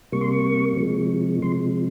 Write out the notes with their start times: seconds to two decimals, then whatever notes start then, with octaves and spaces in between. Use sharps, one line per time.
0.12 C3 G3 A#3 C#6
0.21 C6
0.32 C#6
0.77 C3 F3 G#3
1.42 C3 F3 G#3 C6